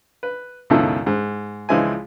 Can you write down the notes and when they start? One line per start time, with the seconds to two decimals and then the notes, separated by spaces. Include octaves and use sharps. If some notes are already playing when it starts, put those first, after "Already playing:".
0.23 B4
0.70 C#2 F#2 B2 D#3 E4 A4
1.06 G#2
1.69 C#2 E3 F3 G#3 E4 G#5